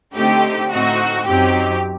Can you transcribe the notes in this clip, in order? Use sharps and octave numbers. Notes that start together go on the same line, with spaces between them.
D3 A3 C4 D#4 G4
A2 A3 C4 D#4 F#4
F#2 F#3 C4 D#4 G4